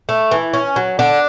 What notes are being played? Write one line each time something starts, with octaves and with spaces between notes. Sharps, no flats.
A3
E3
C#4
F#3
D3 D4